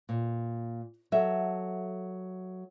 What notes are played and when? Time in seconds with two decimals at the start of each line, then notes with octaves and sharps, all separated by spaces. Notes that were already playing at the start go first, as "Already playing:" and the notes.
0.09 A#2
1.12 F#3 A4 E5